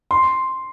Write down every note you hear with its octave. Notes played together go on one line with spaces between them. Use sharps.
C6